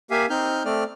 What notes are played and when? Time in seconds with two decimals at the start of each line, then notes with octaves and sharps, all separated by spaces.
0.11 A#3 G4 E5 F5 G#5
0.30 C4 D#4 F6 G6
0.65 A3 C4 D5 F6